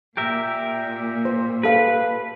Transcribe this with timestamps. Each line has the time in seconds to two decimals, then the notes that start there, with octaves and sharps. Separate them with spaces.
0.17 A#2 G4 A#4 E5
1.25 C5
1.63 G4 A4 B4 F5